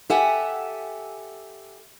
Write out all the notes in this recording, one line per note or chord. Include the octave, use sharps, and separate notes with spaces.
G4 A4 E5 F#5 G#5